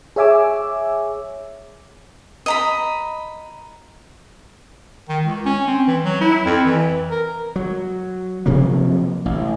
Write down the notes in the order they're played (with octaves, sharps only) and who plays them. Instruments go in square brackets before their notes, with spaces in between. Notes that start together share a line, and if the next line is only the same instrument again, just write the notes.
[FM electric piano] G#4 C#5 E5 G#5 D6 E6
[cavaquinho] D#5 A#5 B5
[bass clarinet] D#3
C#2
C#4
C4
E3
F#3
E4
F2
E3
A#4
[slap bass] F#3
C3 F3 F#3 A#3
A1